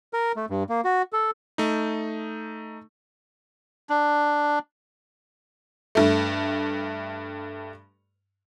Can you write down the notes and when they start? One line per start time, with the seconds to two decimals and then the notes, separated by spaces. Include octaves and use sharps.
0.13 A#4
0.37 A3
0.50 G2
0.69 A#3
0.85 F#4
1.13 A4
1.58 A3 D#4
3.89 D4
5.95 G2 A3